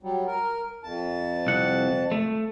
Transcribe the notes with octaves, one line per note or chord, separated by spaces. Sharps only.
F#3 G3
A#4
F2 A5
C2 F#5
A3